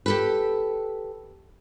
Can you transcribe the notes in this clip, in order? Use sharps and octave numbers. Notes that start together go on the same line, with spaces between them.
G4 A4 B4